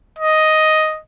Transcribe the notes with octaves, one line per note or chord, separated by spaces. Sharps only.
D#5